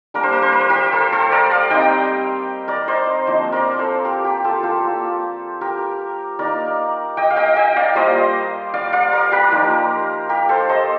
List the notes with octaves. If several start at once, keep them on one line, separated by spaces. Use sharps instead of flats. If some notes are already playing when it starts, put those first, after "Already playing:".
G3 A#3 D4 A#4
C5
A#4
C5
A#4
C5
G4 A#4
A4 C5
A4 C5
A#4 D5
D5 F5
G3 C4 D#4 D#5 G5
A#4 D5
C5 D#5
F3 A#3 D4 C5 D#5
A#4 D5
A4 C5
G4 A#4
G4
F4 A4
F4 A4
A#3 F4
G4 A#4
A#3 D#4 A#4 D5
D#5 G5
F5
D#5 G5
D#5 G5
D5 F5
G3 A#3 F4 C5 D#5
D5 F5
D5 F5
A#4 D5
G4 A#4
F3 A#3 D#4
G4 A#4
A4 C5
C5 D#5